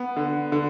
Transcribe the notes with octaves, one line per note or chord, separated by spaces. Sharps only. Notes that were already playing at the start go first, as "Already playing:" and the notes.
Already playing: B3
D3
D3